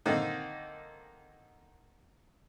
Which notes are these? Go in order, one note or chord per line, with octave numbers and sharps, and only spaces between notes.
D3 D#3 A#3 C4 D#4